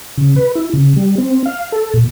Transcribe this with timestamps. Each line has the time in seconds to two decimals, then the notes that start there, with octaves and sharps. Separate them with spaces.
0.18 C#3
0.36 B4
0.55 E4
0.73 C#3
0.96 G3
1.18 C4
1.46 F5
1.72 A4
1.94 A#2